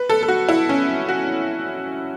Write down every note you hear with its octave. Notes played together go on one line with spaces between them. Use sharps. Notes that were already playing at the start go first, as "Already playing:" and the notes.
Already playing: B4
A4
A4
F#4
E4
C#4
F#4